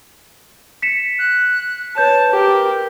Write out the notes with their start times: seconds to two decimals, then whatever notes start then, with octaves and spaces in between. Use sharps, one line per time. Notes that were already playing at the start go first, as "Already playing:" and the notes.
0.82 B6 C#7 E7
1.19 F#6
1.97 B4 C#5 A5 G6 E7
2.32 G4 A#4